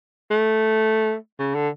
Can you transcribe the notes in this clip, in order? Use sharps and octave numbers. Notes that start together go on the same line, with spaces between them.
A3
C#3
D3